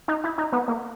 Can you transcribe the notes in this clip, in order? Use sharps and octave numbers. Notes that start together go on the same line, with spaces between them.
D#4
E4
D#4
B3
A#3